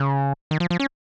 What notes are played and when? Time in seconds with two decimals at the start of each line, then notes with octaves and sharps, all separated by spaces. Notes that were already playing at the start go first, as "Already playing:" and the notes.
Already playing: C#3
0.51 D#3
0.60 F3
0.70 F3
0.80 C#4